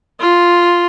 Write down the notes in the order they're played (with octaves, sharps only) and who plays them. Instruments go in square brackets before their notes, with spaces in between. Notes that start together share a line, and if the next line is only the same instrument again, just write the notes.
[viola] F4